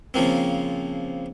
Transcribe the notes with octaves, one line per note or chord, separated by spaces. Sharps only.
C#3 F3 A#3 C4